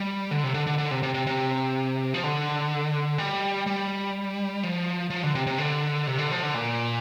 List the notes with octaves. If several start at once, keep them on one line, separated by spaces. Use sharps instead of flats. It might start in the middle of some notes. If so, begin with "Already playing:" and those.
Already playing: G3
D3
C3
D3
D3
D3
C3
C3
C3
C3
F3
D3
G3
G3
F3
F3
D3
C3
C3
D3
C3
D3
F3
D3
A#2